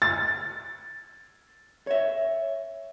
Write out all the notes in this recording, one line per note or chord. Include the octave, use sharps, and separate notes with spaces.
A6
C#5 E5